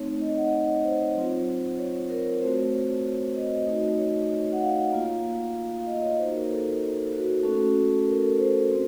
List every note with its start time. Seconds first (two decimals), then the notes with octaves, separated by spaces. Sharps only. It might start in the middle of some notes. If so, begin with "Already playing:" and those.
Already playing: A3 C4 D#4 C#5
0.21 D#5
0.37 F#5
0.53 D#5
0.68 C#5
0.84 C5
1.15 F#3 C4 F4
1.79 C#5
2.10 A#4
2.41 A3 C4 F#4 C5
2.72 C#5
3.36 D#5
3.66 A3 D#4 F#4
3.98 C#5
4.53 F#5
4.61 F5
4.92 A#3 F4
5.80 F5
5.87 D#5
6.02 C#5
6.18 A#3 D#4 F#4 C5
6.33 A#4
6.50 A4
7.12 F#4
7.43 A3 C#4 F#4 A4
8.07 A#4
8.22 A4
8.38 C5
8.70 C4 F#4